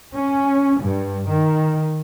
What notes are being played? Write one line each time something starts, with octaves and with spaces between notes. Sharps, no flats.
C#4
G2
D#3